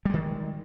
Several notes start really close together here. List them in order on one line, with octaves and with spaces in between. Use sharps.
G3 G#3 D#3